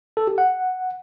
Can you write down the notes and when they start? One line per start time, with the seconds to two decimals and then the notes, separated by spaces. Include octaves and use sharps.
0.17 A4
0.27 G4
0.38 F#5